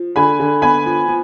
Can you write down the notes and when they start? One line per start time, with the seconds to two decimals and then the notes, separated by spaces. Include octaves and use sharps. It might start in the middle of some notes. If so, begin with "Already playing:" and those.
Already playing: F3
0.16 D3 G#5 B5
0.40 D3
0.62 B3 G#5 B5
0.86 F3
1.08 F3